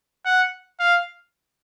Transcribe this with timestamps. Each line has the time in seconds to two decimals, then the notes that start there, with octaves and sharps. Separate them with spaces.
0.25 F#5
0.80 F5